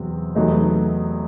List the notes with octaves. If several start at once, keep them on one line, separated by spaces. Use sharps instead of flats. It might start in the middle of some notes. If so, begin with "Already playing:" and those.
Already playing: E2 C3 F#3 C4
E2 C3 F#3 A3 D#4